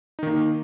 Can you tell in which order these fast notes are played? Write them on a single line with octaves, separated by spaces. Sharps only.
D#4 D#3 A#3